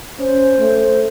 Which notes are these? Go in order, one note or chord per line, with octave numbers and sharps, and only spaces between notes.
C#4 C5
A3